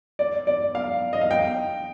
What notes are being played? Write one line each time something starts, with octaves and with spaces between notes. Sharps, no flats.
D5
D5
F5
D#5
F5
G5